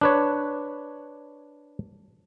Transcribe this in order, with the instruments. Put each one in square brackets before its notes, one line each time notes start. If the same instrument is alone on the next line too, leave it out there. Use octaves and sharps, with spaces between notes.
[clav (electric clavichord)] D4 B4 C#5